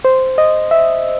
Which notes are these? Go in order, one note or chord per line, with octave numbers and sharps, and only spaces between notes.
C5
D#5
E5